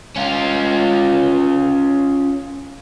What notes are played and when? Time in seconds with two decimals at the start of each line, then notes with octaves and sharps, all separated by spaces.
0.16 C#4 F4